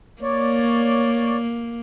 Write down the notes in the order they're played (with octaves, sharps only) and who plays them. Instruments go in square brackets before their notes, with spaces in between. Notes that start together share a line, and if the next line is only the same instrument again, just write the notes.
[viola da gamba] A#3 [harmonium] C#5 D5